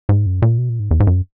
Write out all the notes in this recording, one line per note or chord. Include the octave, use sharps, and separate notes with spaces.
G#2
F#2
A#2
B2
A#2
G#2
E2
G#2
F#2